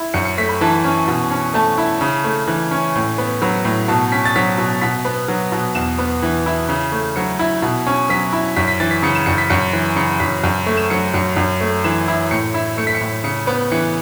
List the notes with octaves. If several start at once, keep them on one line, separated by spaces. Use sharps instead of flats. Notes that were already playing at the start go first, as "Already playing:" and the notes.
Already playing: E4
F#2 C#7
C#7
A3 B6
B5
E3 A5
C#4
B2
C#4
A3 A5
E4
C#3
A3
E3
C#4
A2
B3
F#3 B5
A2
B2 A5
C#4 B6
A6
F#3 B6
B2
B2 B6
B3
F#3
B2
E2 E7
B3
E3
E4
C#3
A3
F#3 C#7
E4
B2
C#4
F#3 B6
E4
F#2 B6
B6
E3 A6
B6
C#3 C#7
E7
F#2 C#7
B6
F#2 C#7
E3
C#3 C#7
F#2 B6
F#2
A3
E7
F#3 C#7
F#2 C#7
F#2
A3
E3 E7
E4
A2 C#7
E4
A3 C#7
B6
C#7
A2
C#3 C#7
B3
E3 C#7